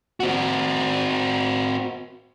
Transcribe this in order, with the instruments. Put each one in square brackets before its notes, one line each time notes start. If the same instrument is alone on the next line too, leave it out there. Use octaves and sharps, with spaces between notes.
[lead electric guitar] C4 F#4